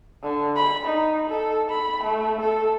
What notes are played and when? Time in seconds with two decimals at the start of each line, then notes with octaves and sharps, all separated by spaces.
0.23 D3
0.56 B5
0.85 D#4
1.29 A4
1.70 B5
2.03 A3
2.40 A4